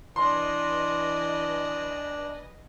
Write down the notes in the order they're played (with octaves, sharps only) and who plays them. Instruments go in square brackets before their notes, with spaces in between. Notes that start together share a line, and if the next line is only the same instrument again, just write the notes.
[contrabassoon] E3 [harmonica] D4 [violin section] B4 D#5 G#5 [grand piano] C6